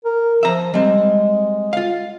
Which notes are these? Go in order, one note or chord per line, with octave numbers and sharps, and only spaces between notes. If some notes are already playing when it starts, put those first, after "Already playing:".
A#4
F3 E5 A#5
G3 G#3 C4
F4 F5